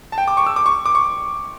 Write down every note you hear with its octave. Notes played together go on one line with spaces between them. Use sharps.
A5
G5
D6
C#6
E6
D6
C#6
D6
C#6